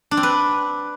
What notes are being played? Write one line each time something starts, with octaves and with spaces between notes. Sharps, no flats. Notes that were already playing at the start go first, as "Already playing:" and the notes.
D4
C4
B4